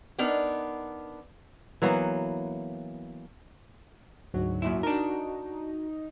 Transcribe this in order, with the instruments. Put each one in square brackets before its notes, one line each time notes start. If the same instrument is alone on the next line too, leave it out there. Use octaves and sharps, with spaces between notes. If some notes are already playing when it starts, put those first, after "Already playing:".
[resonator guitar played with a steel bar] B3 D4 D#4 A#4
[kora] E3 F#3 A#3 B3
[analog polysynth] D2 G#2 F#3 [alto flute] F#4
[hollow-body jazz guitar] F#2 A#2 E4
[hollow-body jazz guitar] D4 A#4 [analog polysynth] D#4